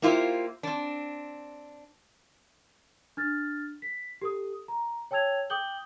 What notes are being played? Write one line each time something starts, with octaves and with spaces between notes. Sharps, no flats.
A#3 E4 F4 G4 C5
C4 D4
D4 F6 A6
B6
G4 A4 D#6
A#5
C#5 G5 A5 E6 G#6 F7
G5 D6 D#6 G6 F#7 G7